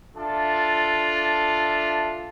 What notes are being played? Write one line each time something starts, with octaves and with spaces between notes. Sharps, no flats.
D4 F4 A4 E5